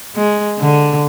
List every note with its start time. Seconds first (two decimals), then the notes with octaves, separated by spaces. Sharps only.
0.16 G#3
0.59 D3